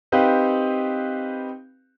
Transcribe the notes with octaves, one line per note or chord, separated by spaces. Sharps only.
C4 D#4 G4 B4 F5